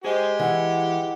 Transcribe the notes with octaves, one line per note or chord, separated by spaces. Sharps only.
G4 G#4 C5 D#5
E3 F#5